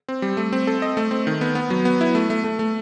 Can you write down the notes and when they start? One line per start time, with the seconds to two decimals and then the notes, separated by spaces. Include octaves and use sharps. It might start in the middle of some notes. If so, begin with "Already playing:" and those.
0.09 C4
0.22 G3
0.37 A3
0.53 C4
0.67 A4
0.82 D#5
0.97 A3
1.11 C4
1.27 D#3
1.41 B3
1.55 B3
1.70 F#3
1.85 B3
2.01 E4
2.15 A3
2.30 A3
2.44 A3
2.59 A3